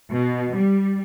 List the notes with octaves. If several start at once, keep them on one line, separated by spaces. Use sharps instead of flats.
B2
G3